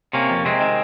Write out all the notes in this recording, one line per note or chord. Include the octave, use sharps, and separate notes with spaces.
C3 A#3 C#4
F2
C3 G#3 C4
D#3